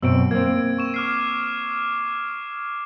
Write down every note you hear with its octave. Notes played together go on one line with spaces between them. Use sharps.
F#2 B2 C4 E6 D7
A#3 C4 G#6
C#6 E7
D6 F6 C7